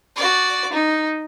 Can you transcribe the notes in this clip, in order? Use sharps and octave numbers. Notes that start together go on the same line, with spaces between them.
F#4 D5
D#4